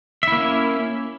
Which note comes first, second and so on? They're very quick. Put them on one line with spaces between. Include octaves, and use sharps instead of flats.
E5 E4 A#3 C#4